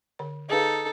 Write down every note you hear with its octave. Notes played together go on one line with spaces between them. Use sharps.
D3 C#5
D#4 G#4 A4 B4 F5